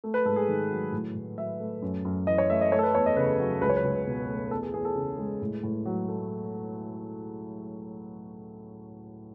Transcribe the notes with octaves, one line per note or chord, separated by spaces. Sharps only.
A3
B4
G#2 A4
G#4
D#3
F#3
A2
A2
F#3 E5
A3
F#2
F#2
E3 D#5
C#5
A3 E5
D#5
A3 C#5
A4
B4
E2 C#5
D#5
C#3 B4
F#3
C#2 B4
C#5
B4
C#2
B2
A3
E2 A4
G#4
E2 G#4
A4
C#3
G#3
A2
A2
F#3
A3